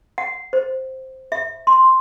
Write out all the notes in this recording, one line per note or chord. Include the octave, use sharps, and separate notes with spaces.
F#5
C5
E5
C6